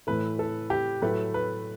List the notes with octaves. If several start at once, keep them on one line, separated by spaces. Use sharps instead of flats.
A2 E3 A3 B4
A4
G4
A2 F#3 A3 B4
B4